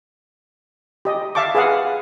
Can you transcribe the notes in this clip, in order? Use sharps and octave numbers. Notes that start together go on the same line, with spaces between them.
G4 D#5
E5 F5 A5 C#6 D6
G#4 B4 F5 F#5